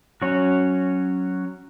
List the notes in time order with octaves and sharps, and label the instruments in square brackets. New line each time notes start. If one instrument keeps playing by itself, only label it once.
[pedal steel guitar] F#3 C#4 F#4 C#5